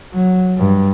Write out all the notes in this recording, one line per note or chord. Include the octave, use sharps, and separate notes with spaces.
F#3
G2